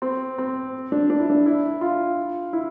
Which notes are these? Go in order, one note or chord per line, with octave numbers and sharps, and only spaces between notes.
C4
C4
D4
D4
E4
D4
E4
F4
E4